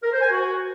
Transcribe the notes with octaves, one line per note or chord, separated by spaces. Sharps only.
A#4
C5
G#5
F#4